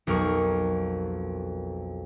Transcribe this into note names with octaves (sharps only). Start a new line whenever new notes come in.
B1 F2 A#4 C#6